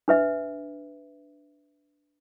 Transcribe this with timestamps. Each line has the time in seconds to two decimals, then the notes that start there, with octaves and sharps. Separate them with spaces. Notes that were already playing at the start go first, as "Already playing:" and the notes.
0.08 D4 B4 E5